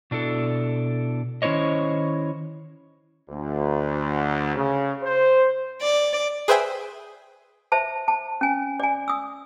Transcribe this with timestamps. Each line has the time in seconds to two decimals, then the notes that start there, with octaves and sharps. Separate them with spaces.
0.11 B2 D4 E4 A4
1.42 D#3 C#4 E4 C5 C#5 D#5
3.30 D2
4.55 C#3
5.03 C5
5.81 D5
6.48 G#4 B4 C5 E5 G5 G#5
7.72 C5 E5 A5
8.08 A5
8.41 C#4 G#5
8.80 D5 G#5
9.08 D#6 E6